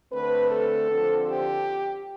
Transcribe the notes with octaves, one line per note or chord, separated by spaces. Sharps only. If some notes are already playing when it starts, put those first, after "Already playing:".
D3 A3 C4 B4
A4
D3 F3 C4
G4